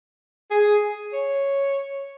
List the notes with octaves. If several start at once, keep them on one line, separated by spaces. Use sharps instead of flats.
G#4
C#5